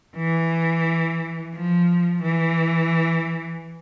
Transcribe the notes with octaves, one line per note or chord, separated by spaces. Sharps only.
E3
F3
E3